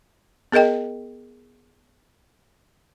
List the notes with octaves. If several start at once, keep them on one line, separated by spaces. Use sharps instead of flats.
B3 G#4 A#4 D#5 G5